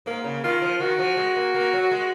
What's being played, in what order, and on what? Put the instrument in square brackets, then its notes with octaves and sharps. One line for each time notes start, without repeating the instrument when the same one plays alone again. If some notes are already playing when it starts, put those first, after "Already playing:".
[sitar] G#2 [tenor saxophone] A#3
[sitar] C#3
[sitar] D#3 [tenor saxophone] F4
[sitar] F3
[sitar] D#3 [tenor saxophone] F#4
[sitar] F3
G#3
A#3
A#3
F#3
G#3